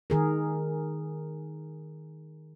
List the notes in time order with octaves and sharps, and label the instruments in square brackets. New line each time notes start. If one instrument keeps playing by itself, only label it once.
[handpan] D#3 G#4 A#4